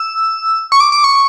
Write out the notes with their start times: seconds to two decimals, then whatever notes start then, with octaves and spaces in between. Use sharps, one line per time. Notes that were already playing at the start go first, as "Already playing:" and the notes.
Already playing: E6
0.72 C#6
0.80 D6
0.92 D6
1.04 C#6